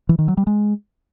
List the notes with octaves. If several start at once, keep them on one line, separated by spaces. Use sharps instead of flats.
E3
D#3
F#3
G3
G#3